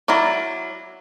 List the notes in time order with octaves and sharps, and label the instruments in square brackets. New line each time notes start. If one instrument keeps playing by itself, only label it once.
[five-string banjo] F#3 E4 A#4 D5